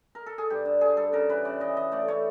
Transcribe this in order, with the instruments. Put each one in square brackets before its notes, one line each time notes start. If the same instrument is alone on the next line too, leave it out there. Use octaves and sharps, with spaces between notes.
[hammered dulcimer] A#4
A4
G#4
G2 G4
D3
D3 G#4
G2 A4
C#3 A#4
E3 B4
C#3 D5
E3 D#5
E3 D#5
A3 D5
A3 C#5